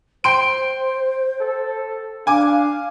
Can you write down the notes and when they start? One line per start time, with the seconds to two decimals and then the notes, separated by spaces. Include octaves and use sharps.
0.24 C5 G5 C6 D7
1.40 A4
2.27 D4 F5 G#5 D6